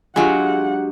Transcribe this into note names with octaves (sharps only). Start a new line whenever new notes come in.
F#3 G#3 D4 F4 G4 G#4 F#5